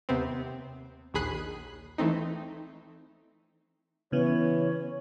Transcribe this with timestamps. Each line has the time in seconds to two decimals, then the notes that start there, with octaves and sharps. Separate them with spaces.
0.09 D#2 C3 B3 C4
1.14 A#1 D#2 G#4 B5 F#6 C7
1.98 E3 A3 C4 D#4
4.12 C#3 E3 B3 C#5